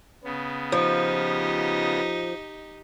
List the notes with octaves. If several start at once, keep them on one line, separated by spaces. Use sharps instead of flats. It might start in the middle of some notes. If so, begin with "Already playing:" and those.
C#3 B3
F3 D#4 G4